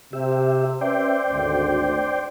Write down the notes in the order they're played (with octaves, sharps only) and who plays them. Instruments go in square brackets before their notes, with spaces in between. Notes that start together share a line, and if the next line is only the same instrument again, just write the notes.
[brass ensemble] C3 [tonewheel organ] G4 E5
[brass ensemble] C#4 B4 E5 [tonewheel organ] C5 D5 G5
[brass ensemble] G#1 D2